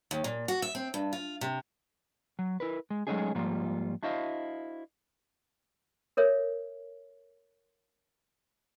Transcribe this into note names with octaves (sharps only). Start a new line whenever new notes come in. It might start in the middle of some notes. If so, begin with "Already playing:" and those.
D#2
A#2
F#4
E5
C4
G2
F4
C3
F#3
E4 A#4 B4
G#3
F#3 G#3 A3 C#4 D#4 G#4
G#2 F3 G3 A#3 F4
D4 E4 F#4 C5 D#5 F5
A4 A#4 C#5 E5